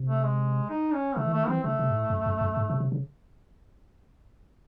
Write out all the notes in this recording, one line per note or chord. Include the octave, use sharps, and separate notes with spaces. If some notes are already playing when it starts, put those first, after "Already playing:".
Already playing: C3
A3
G#3
D#4
C#4
C#3 A3
E3
D#3 A3
E3 C4
C#3 A3
C3
G#2
A2
F#2
F#2
F#2
G#2
C3
C3
C#3